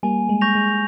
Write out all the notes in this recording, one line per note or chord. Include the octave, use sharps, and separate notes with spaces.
G3 A#3 G#5
G#3
C#6 G6 A#6 F7
G#3